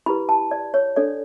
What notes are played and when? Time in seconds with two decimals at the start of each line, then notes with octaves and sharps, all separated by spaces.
0.06 E4 G4 B4 B5
0.29 A5
0.51 D5
0.74 C#5
0.96 D4 A4 C#5 D5